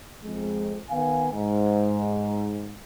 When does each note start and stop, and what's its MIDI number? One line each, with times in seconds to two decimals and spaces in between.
0.24 0.80 41
0.24 0.80 56
0.90 1.27 51
0.90 1.27 59
0.90 1.27 77
0.90 1.27 80
1.33 2.77 44